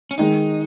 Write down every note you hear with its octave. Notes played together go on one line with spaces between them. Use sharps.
C#4
D#3 G#3 D#4